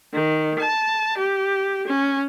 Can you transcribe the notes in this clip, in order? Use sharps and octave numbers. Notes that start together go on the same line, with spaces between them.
D#3
A5
G4
C#4